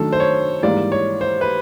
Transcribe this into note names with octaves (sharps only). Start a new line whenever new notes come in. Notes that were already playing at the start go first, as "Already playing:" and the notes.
Already playing: D#3 F#3 A3 D4 A4
C5
C#5
G#2 E3 G3 A#3 D5
C#5
C5
B4